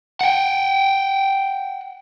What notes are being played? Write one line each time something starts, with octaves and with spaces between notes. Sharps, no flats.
F#5 G5